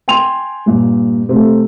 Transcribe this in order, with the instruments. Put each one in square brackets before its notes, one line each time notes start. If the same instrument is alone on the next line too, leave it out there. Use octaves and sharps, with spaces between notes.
[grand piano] G5 G#5 C6 F7
G2 A#2
C3 A3